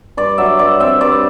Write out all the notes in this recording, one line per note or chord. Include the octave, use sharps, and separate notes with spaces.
G2 D5
F#3 E5
G2 D5
C4 E5
G2 D5